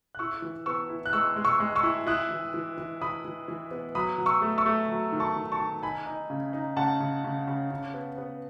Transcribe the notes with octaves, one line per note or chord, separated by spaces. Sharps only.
F#6
E4 C#6 E6
E3
B3 C#6 E6
E4
F#6
G#3 C#6 E6
G#3
C#6 E6
G#3
C#6 E6
E4
E4 D#6 F#6
E3
E3
E3
E3 B5 D#6
E3
E3
B3
F#3 B5 D#6
F#3
C#6 E6
A3
C#6 E6
A3
F#3
D#3
A5 C#6
D#3
A5 C#6
D#3
D#4 G#5 B5
D#4
C#3
D#4
C#3 F#5 A5
C#3
C#3
C#3
C#3
B3
B3